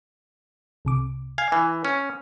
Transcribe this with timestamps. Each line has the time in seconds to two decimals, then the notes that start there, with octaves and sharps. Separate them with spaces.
0.85 C2 C3 D6
1.38 F5 G#5 G#6
1.52 E3 G#5
1.85 C#4